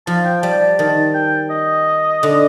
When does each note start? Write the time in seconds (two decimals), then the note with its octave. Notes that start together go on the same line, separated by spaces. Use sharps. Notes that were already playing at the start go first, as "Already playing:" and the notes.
0.07 F3 A5
0.25 G5
0.42 G3 A5
0.61 A5
0.79 D#3 A5
1.14 G5
1.50 D#5
2.23 D3